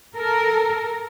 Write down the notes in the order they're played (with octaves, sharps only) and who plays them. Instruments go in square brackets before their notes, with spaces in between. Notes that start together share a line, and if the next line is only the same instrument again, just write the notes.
[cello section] A4 A#4